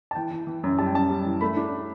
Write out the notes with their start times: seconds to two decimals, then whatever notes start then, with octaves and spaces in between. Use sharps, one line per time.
0.11 A5
0.15 E3 G5
0.31 E3
0.47 E3
0.64 F#2
0.78 G3 A5
0.87 G5
0.94 F#2 A5
1.10 G3
1.25 E3
1.41 A3 B5
1.57 D4